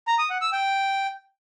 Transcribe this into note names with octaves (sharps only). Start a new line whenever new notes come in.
A#5
D#6
F#5
E6
G5